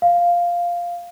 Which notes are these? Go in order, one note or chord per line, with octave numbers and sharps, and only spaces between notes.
F5